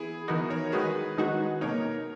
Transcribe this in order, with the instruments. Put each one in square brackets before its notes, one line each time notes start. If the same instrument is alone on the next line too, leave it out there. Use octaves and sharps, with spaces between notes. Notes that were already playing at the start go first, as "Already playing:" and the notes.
Already playing: [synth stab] E3 B3 [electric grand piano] E4 G#4
[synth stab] E3 B3 D#4 [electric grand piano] F#4 A#4
[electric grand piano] A#4 C#5
[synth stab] D#3 G#3 D#4 F#4 [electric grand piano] G#4 B4
[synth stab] D#3 G#3 D#4 F#4
[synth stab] B2 A#3 D#4 [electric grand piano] A#4 C#5